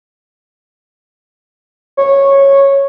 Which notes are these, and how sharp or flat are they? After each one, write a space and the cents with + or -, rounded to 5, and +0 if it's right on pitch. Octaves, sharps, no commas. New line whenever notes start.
C#5 -10